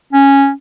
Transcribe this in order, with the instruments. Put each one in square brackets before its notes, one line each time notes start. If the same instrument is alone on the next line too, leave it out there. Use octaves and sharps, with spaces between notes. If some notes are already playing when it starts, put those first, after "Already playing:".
[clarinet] C#4